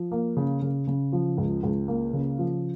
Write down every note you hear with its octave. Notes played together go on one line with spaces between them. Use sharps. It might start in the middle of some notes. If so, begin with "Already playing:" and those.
Already playing: F3
A#3
C#3
C#3
C#3
F3
C#2
C#2
A#3
C#3
F3